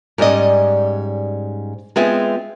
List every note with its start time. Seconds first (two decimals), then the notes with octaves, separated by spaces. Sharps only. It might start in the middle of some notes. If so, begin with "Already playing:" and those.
0.18 G#2 G3 C#4 D5 D#5
1.96 G#3 B3 C4 F4 G#4 E5